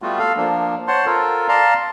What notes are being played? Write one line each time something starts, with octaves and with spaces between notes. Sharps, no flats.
G3 A3 B3 F4 F#4
A4 F5
F3 A#3 D4
C5 C#5 F#5 A5 C6
F4 A4 A#4
D5 F5 A5 A#5 C6